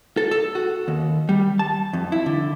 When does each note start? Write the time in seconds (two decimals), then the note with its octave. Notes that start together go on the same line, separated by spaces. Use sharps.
0.17 A4
0.31 A4
0.55 F#4
0.88 D#2
1.29 G3
1.59 A5
1.93 F2
2.12 E4
2.26 D3